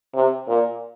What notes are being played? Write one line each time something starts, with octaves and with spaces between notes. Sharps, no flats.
C3
A#2